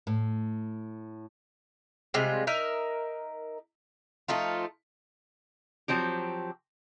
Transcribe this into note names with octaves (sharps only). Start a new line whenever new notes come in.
A2
C3 G3 G#3 F4
D#4 A#4 E5
F3 A3 D#4 F4
F3 F#3 C4 G4